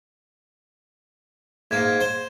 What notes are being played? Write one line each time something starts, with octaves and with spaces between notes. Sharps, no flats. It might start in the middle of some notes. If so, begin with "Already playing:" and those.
G#2 A#3 G#6
C5